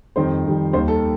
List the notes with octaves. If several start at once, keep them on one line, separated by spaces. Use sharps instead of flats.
F2 D#3 G3 C5
F2 D#3 G3
D#2 D#3 G3 C5
A4